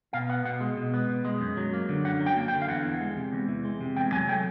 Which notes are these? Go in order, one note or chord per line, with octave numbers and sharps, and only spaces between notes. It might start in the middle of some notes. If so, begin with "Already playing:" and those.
B2 F5
B3 F#5
B2 F#5
G#3
B2
B3
B2
G#3
F#2
F#3
A#3
D3
F#2 F#5
F#3
G5
A#3
G5
D3
F5
E2 F#5
E3
G#3
C3
E2
E3
G#3
C3
E2 G5
F#3 G#5
A3 G5